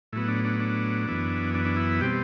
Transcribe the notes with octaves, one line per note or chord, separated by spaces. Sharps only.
A2 F#3 B3 E4
D4
D4
D4
F#2 E3 B3
D4
D4
E4
B2 G3 C4 G4